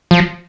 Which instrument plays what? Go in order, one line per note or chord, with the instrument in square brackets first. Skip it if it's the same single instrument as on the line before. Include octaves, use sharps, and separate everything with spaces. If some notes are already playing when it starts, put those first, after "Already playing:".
[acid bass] F3